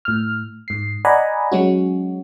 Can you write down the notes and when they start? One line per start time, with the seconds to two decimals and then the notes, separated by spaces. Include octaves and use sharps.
0.05 A2 F6
0.68 G#2 C7
1.05 D5 D#5 F#5 G#5 A#5 B5
1.52 F#3 G#3 C#4 F#4